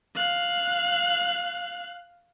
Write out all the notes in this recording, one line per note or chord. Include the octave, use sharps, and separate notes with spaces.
F5 F#6